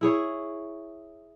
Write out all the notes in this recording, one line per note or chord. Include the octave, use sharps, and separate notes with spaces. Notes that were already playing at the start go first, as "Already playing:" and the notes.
E4 G#4 C#5